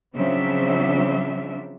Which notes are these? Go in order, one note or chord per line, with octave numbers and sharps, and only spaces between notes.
C#3 F3 F#3 C4 D4 E5